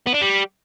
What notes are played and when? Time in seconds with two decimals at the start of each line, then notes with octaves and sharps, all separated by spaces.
0.07 B3
0.14 D4
0.22 G3